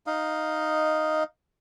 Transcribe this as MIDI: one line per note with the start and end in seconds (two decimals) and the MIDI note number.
0.07 1.23 63
0.07 1.23 75
0.07 1.23 77